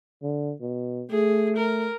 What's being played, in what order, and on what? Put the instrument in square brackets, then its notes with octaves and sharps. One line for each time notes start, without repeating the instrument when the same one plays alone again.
[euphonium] D3
B2
[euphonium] A3 [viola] G#4
[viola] A#4